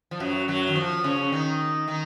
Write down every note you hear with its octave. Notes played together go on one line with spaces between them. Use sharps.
F3
F#2 F#3
F#2 F#3
D#3
F3
C#3 C#4
D#3 D#4
D#3 D#4